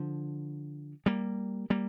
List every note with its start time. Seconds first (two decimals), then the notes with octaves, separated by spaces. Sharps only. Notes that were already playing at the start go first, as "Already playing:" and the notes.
Already playing: D3 F3
1.06 G3 A#3
1.70 G3 A#3